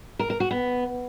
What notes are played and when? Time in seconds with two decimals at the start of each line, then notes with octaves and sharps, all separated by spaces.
0.19 A#4
0.30 A#4
0.40 F#4
0.51 B3